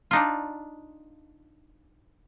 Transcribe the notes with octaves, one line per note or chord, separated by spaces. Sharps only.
D4 D#4 F4